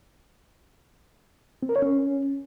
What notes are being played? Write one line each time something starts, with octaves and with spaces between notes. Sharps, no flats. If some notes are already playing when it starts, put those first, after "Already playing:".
C4
A#4
C#5
C#4